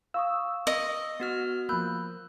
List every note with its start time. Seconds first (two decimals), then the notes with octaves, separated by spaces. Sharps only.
0.14 F5 C#6 D#6 E6
0.67 D#5
1.20 B3 F#4 F6
1.69 F3 A#3 B5 E6 F#6 G6